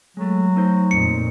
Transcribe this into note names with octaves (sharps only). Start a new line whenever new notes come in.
F#3 G#3 A3
A3 D#4 C5
F2 A#2 C#7